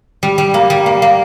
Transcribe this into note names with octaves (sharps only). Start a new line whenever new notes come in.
G3
G3
A#3
G3
A#3
A#3